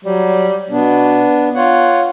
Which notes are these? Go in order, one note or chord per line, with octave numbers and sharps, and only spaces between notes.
F#3 G3
B2 B3 D4
F4 C#5 F#5